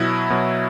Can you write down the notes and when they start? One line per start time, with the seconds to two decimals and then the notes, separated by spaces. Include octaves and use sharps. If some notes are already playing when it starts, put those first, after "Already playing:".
Already playing: B2 F#3 E4
0.30 B2 F#3